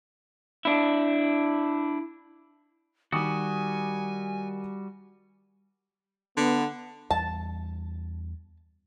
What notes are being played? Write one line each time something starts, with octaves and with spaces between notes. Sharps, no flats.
D4 E4
D#3 G3 F#4 G#5 D6 D#6
D3 B3
E2 G3 A5